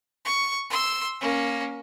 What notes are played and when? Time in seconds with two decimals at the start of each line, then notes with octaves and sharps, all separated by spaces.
0.25 C#6
0.70 C6 E6
1.21 A#3 C#4